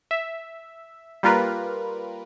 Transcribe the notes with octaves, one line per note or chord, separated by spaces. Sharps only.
E5
G3 A#3 F4 A#4 B4